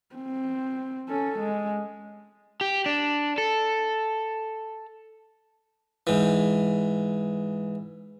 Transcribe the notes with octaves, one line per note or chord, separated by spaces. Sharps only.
C4
C#4 A4
G#3
G4
D4
A4
G#2 E3